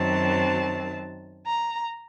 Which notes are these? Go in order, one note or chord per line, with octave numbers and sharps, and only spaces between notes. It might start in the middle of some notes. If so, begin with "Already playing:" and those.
Already playing: F#2 D#3 F#3 C4 A5
A#5